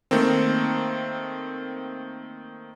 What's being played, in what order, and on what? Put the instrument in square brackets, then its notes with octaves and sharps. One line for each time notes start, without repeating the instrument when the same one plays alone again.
[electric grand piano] D#3 A3 A#3 C4